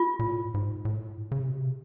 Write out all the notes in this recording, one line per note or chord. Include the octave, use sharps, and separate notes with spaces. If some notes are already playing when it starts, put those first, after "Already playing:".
Already playing: F4
A#2
A2
G#2
A2
C#3
C3
B2
C3